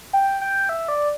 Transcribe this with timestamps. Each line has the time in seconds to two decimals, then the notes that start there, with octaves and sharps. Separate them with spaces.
0.13 G5
0.41 G5
0.69 E5
0.88 D5